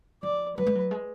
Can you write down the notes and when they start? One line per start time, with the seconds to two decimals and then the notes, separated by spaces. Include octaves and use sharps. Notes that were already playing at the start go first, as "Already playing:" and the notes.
0.23 F3 D5
0.57 F#3 B4
0.67 G#3
0.75 F#3
0.91 G#3